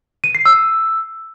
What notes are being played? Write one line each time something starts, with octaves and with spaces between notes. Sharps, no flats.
D#7
C7
E6